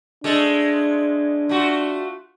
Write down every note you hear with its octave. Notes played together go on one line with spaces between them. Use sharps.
G#3 A3 D4 A4
A3 F4 F#4